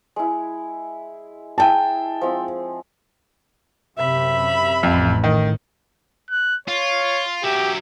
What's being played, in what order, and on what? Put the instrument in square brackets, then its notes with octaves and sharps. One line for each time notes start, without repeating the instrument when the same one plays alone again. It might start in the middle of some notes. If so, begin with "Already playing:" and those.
[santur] G#3 E4
[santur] E4 G#4 E5 [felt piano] G5 A5
[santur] F3 G#3 C4
[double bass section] F#2 C3 [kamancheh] E5 B5
[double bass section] A1 A2 [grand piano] F2
[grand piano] D#3
[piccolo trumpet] F#6
[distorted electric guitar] F4 [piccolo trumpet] C#5
[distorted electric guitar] F#3 E5 [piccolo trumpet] G4